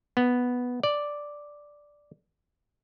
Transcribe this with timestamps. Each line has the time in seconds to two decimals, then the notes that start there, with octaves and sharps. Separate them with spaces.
0.17 B3
0.83 D5